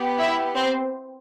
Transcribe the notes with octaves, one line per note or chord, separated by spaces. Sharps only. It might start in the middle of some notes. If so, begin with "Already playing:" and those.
Already playing: B3 G4
E4 E5
C4 C5